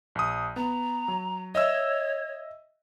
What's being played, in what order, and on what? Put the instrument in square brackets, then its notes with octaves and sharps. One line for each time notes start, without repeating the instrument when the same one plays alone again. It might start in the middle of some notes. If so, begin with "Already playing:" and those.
[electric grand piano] A#1 D#6
[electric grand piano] B3 [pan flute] A#5
[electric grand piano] F#3
[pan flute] C#5 [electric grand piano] D#5 E5 E6